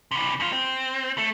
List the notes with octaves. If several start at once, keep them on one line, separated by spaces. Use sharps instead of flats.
C3 E3
F#2 F4
C4
A3